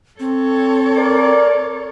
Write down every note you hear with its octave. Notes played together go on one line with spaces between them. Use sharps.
C4 A4 C#5
A#4 D5